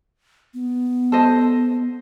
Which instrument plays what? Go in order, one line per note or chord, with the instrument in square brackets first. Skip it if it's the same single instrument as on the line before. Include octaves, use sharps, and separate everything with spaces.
[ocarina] B3
[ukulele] A4 C5 D#5